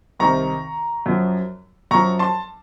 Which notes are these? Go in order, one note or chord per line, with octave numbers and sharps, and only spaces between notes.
C2 C3 D#3 A#5 C#6
F#2 F3
F#2 F3 A#5 C#6
A5 C6